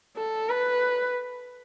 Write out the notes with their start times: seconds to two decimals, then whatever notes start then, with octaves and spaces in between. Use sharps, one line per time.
0.17 A4
0.49 B4